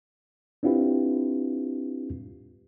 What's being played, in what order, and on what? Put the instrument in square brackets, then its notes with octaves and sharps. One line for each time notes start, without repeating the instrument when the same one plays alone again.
[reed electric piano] C4 D4 E4 F4 G4 B4